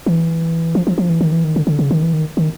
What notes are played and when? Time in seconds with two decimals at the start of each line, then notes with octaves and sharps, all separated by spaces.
0.06 E3
0.75 F3
0.87 F3
0.98 F3
1.09 E3
1.21 D#3
1.32 E3
1.44 D#3
1.56 D3
1.67 D3
1.79 C#3
1.91 D#3
2.02 E3
2.13 D#3
2.37 D#3